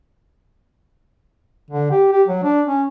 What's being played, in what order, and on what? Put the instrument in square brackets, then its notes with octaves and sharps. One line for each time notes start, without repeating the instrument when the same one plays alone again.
[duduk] D3
G4
G4
F#3
D4
C#4